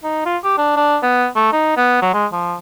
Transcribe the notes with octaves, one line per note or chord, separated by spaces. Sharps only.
D#4
F4
G4
D4
D4
B3
A3
D#4
B3
F#3
G#3
F3